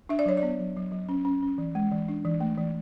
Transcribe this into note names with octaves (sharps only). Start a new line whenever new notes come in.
D4 E5
D5
F#3 C#5
D5
B3
F#3
F#3
F#3
C#4
C#4
C#4
E3
G#3
E3
D4
E3
A3
E3